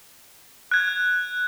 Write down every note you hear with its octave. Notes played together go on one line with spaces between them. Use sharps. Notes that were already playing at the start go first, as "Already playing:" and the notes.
F#6 G#6